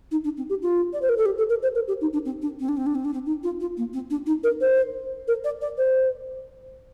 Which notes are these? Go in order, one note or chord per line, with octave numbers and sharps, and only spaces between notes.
D#4
D4
C4
G4
F4
D5
C5
A#4
A4
G4
A4
A#4
C5
A#4
G4
D#4
D4
C4
D4
C4
D4
C4
D4
C4
D4
C4
D#4
F4
F4
A#3
C4
D4
D#4
A#4
C5
A#4
D5
D5
C5